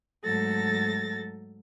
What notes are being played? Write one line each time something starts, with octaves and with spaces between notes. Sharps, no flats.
G#2 F#3 A3 A4 A6 A#6